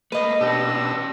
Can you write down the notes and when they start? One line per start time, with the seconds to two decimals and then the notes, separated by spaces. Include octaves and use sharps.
0.12 A3 A#3 B4 D#5 D#7
0.41 B2 C#4 D4 G4 A5 E6 A#6